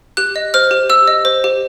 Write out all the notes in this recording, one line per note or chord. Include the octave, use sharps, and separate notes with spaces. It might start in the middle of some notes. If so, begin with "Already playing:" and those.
G4 F#6
D#5
C5 F6
G4
G4 E6
D#5
C5
G4